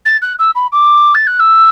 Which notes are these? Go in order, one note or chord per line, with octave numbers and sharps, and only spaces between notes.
A6
F#6
E6
B5
D6
A6
F#6
E6